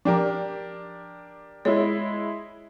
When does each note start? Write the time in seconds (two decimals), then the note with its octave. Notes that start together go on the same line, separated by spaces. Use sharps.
0.05 F3 D4 G4 A#4
1.65 G#3 E4 C#5